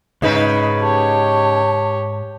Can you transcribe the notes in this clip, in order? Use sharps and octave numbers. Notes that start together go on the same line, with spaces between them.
C#2 G#2 C#3 D#4 B4
G4 C#5 A5